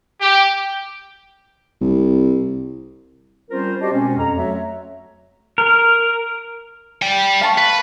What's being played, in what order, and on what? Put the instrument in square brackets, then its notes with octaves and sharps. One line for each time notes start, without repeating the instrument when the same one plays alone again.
[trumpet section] G4
[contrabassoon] C2
[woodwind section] G3 C4 C#4 F4 A#4 C5
D4 F#4 G4 C5 D5 D#5
B2 G#3 C4 C#4
F2 A#5
F#3 A3 F#4 C#5 E5
[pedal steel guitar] A#4
[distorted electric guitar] D5 G5
[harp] F5 A5 C#6
[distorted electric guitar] B4